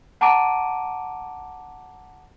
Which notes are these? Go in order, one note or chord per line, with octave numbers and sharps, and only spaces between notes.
F#5 A5 A#5 D6 D7 D#7